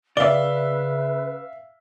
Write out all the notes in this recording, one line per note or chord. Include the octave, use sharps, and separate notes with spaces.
C#3 B4 D5 E5 F5 G7